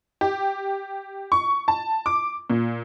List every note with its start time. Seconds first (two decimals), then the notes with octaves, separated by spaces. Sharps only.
0.21 G4
1.32 C#6
1.68 A5
2.06 D6
2.50 A#2